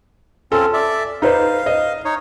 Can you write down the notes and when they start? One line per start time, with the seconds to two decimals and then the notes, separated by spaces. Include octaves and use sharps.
0.52 C4 C#4 F4 A4
0.74 D5 E5
1.22 D#4 B4 C5 F5
1.66 D#5
2.05 D#4 C#5